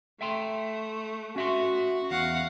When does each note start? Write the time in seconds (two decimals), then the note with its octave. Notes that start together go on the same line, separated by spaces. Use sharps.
0.21 A3 E5 G5 C6
1.36 C#4 F#4 E5 C6
2.11 E2 F5 F#5